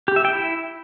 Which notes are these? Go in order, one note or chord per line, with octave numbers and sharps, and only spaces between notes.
G4
E5
G5
E4